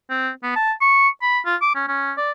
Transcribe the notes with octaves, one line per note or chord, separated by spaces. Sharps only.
C4
B3
A5
C#6
B5
F4
D6
C#4
C#4
D5